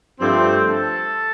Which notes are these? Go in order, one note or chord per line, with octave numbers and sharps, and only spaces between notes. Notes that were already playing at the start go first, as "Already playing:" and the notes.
G2 F3 A3 C4
A4